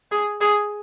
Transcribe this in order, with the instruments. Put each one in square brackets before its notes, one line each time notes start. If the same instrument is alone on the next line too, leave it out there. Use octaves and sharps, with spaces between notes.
[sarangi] G#4
G#4